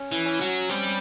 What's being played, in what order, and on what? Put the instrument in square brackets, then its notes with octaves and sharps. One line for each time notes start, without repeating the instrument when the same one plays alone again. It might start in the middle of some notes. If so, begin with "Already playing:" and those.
Already playing: [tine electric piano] C#4
[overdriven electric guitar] E3
[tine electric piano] C#4
[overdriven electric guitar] F#3
[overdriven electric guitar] G3 [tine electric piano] C4